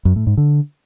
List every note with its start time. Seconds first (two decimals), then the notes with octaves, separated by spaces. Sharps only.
0.05 F#2
0.16 A2
0.27 G#2
0.37 D3